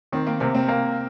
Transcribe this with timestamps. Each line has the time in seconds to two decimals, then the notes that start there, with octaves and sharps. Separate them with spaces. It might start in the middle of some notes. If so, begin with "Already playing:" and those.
0.12 D#3 C4
0.27 A#3
0.40 C3 A#3
0.55 C4
0.68 A#3